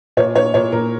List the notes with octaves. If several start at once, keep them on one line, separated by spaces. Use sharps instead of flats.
A#2 C#5
A#2 C#5
A#2 C#5
A#2 A#4